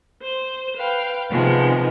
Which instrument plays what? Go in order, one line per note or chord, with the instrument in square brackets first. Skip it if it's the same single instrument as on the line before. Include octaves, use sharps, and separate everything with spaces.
[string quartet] C5
B4 F5 G5
C3 D#3 F3 G#3 B3